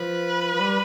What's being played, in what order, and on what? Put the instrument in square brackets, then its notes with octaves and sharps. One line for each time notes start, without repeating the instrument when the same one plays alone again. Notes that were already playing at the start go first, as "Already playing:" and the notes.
Already playing: [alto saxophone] F3 [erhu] B4
[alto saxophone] F3
G3